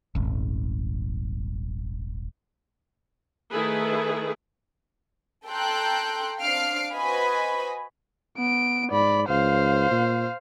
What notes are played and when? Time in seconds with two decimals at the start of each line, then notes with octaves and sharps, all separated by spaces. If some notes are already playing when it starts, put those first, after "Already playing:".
0.15 D#1 G#1
3.52 D#3 A3 E4 G#4 A4 B4
5.47 A4 G5 A#5 C6 F#6 G6
6.41 C4 D4 F5 F6 C7 D7
6.94 F#4 B4 C5 D#5 G#5 B5
8.37 B3 D7
8.91 G#2 D5 B5
9.28 C#2 C5 F5
9.91 A#2